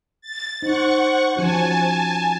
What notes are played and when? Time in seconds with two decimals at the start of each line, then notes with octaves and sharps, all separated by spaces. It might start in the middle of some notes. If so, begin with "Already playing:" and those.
0.21 A6
0.62 D#4 C5 F#5 C#6
1.36 F3 C#4 F#4 G#5 A5